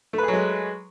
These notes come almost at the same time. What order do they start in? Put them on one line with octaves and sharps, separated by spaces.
A3 B4 G#4 F#3 G#3